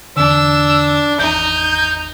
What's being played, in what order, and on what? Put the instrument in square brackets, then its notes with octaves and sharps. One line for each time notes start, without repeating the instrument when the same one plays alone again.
[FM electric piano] E2 D3 [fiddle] D4 [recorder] E6
[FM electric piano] G#1 E2 [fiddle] D#4 [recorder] G6